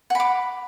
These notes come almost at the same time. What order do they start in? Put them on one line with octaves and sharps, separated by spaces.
F#5 B5 D6